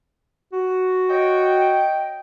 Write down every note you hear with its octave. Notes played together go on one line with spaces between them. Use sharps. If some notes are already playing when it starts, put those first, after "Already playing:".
F#4
C#5 D#5 G5